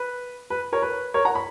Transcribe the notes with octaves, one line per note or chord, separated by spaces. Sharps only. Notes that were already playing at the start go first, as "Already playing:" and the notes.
Already playing: B4
B4
A#4 C#5
B4
A#4 C#5
F#5 A#5
B5